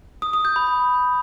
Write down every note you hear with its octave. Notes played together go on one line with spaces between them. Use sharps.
D#6
D#6
G6
B5